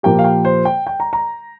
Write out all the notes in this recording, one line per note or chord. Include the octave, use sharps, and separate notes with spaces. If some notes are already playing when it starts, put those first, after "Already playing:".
A#2 F3 A#3 G4 G5
F5
G5
C5
G5
G5
A#5
A#5